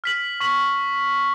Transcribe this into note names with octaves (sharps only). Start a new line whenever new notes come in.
F6 B6 F#7
C#6 B6 F#7